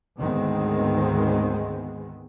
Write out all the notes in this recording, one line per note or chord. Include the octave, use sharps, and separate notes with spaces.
D2 G#2 D#3 G#3 B3 C4